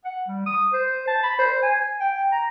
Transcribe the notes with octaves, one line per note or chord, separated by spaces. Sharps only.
F#5
G3
D#6
C5
A5
B5
C5
G#5
G5
A#5